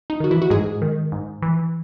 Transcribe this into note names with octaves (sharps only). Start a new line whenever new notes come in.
D#4
D#3 F#4
E3 E4
F#4
G#2 G#3 G#4
D#3
G#2
E3